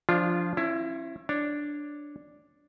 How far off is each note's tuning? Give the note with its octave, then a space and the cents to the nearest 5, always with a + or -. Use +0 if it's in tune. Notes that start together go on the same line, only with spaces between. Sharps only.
F3 +5 D4 +0 F4 -15
C#4 -35 E4 +20
D4 +0 C#5 +0